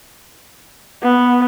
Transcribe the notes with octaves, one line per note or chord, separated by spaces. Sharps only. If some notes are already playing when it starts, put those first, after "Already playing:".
B3